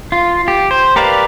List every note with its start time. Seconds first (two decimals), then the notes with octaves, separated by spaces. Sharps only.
0.12 F4
0.48 G4
0.71 C5
0.96 G4 A#4 B4 D5 F5